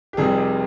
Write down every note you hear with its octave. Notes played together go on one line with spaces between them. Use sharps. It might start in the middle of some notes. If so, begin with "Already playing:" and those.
G4
F1 F2 C3 G3 G#4